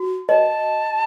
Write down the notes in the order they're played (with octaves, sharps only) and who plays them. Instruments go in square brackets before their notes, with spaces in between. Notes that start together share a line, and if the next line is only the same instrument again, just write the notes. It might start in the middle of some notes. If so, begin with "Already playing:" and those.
Already playing: [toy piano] F#4
[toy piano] D#5 [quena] A5